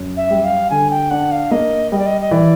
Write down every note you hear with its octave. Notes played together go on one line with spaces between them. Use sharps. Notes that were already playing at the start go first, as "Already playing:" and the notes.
Already playing: F#2
E5
G3
F5
D3 G#5
G5
D4 F#5
F5
A#3 D#5
G3 D#5
D5
D#5
D#5
E3 D5